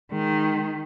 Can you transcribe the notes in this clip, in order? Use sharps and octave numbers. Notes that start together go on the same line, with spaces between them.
D#3 G#3